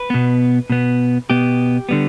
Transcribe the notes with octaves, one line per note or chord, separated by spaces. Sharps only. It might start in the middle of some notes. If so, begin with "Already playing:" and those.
Already playing: B4
B2 B3
B2 B3
B2 B3 G4
D3 G3 B3